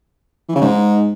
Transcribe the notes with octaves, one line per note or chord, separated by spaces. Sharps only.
E3
C#3
G#2